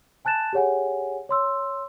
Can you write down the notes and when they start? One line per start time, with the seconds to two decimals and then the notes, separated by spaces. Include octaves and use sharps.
0.25 G#5 A5 F#6 A6 E7
0.53 G4 G#4 C#5 F#5 G#5
1.29 C#5 C6 E6